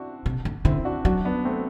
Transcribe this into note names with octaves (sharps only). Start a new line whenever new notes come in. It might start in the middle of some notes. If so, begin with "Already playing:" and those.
Already playing: C4 D4 E4 F#4
C3
D3
D3 C4 E4
D4 F#4
F#3 D4 F#4
B3 D4
A3 C4